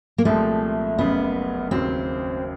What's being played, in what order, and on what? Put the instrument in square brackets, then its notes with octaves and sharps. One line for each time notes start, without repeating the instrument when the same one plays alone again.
[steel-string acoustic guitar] A#3
[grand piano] C2 A#2 F3 G#3 C4 [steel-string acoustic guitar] A3
[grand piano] F#1 F#2 C#3 [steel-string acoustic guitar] B3
[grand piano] D#2 C#3 F#3 [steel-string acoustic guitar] C4